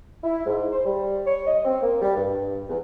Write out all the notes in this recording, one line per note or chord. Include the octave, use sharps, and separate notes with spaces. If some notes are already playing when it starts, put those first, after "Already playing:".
E4
G#2
C5
G3
C#5
D#5
C4
A#3
G3
G2
E2